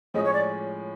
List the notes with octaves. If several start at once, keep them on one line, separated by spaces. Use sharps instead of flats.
A2 F3 G#3 C#4 D#5
C#5
D5